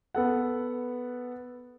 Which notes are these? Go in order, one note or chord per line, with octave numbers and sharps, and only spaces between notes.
B3 A4 F#5